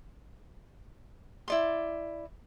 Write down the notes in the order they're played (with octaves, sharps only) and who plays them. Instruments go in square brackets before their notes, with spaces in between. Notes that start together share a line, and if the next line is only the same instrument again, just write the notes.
[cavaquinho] E4 D5 C6